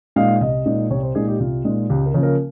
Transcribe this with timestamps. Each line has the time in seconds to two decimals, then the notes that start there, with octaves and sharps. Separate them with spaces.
0.16 A#2 G#3 D#4 F5
0.41 C2 D#5
0.66 A#2 G#3 D#4
0.90 C2 C#5
1.03 C5
1.15 A#2 G#3 D#4 G#4
1.28 G4
1.40 C2 F4
1.65 A#2 G#3 D#4
1.89 C#2 G4
2.06 A#4
2.14 C#3 F3 A#3 C#4
2.23 A#4